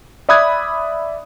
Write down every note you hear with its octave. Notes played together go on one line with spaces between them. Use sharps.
D5 E5 B5 D#6 F#6 G#6